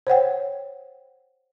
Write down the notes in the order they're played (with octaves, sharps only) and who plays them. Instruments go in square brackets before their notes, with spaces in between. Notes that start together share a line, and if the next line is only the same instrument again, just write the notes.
[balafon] C5 C#5 F#5 G5